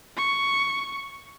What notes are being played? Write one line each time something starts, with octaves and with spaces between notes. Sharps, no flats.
C#6